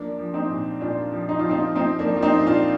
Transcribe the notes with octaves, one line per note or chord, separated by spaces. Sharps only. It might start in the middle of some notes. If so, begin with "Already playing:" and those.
Already playing: F3 A#3 D4
F3
C4 D#4
A#2
A#2 D4 F4
F3
D#4
F3 F4
C4 D#4
F3 C4 D#4
A#3 D4
F3
F4
C4 D#4
A#2
D4 F4